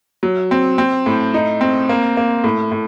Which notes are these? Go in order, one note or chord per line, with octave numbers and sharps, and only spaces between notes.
F#3
C4
C4
A2
D#4
C4
A#3
A#3
A2
A2